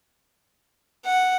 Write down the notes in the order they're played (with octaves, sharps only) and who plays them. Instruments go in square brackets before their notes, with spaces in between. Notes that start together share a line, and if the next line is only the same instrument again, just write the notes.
[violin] F#5